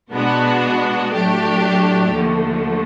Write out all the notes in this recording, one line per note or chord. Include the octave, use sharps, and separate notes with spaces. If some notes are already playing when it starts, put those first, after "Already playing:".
B2 G#3 B3 D4 F#4
A2 F#3 A3 D4 G4
D#2 D3 F3 A3